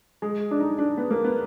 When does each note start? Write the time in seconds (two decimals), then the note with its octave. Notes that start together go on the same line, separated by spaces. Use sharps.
0.22 G#3
0.51 D4
0.60 D#4
0.78 D4
0.98 B3
1.11 A#3
1.25 B3